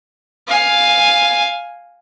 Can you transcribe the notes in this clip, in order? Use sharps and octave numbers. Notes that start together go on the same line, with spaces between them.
F5 G#5